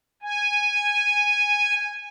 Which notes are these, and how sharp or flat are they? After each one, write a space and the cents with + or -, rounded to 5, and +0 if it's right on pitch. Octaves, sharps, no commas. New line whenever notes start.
G#5 -10